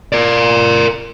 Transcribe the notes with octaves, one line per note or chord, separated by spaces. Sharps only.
A#4 D5